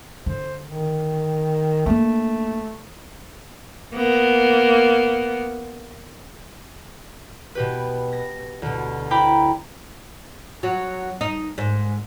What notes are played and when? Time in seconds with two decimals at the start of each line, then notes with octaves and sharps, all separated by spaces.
0.26 D3 C5
0.67 D#3
1.86 A3 A#3 D4
3.94 A#3 B3
7.55 B2 G4 B4
8.13 A#6
8.62 D2 B2
9.10 E4 C5 G5 A#5 B5 D6
10.63 F#3
11.21 D#4
11.58 G#2